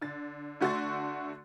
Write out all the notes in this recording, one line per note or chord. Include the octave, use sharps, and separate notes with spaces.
D3 A6
D3 A3 F#4 C6 C#6 A6